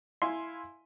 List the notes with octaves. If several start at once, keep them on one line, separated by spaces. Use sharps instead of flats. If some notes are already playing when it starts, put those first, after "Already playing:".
E4 F5 G#5 C6